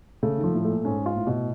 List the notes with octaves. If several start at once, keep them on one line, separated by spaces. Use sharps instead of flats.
C#3 A3
D#3
F3
A2
A3
A#2
G#2 C#4
F4
A2
B2